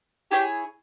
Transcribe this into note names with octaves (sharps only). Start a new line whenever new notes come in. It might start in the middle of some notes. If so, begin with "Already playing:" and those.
E4 G4 G#4 C#5